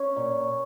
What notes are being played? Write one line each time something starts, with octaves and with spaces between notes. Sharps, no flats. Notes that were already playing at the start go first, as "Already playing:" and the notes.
Already playing: C#4 C#5
A#2